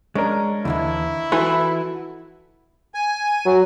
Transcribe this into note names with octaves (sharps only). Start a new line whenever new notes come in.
G#3 C#4 D4 A#4
D#2 D3 E3 E4
E3 F#4 A4
G#5
F#3